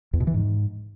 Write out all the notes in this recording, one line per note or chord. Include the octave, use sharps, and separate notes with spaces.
E2
B2
E3
G#2